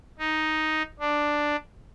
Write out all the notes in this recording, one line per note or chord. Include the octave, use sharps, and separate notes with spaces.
D#4
D4